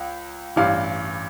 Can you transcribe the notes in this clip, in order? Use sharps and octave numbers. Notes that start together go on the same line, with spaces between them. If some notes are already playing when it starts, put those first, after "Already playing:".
Already playing: C#2
A1 G2 E3 F5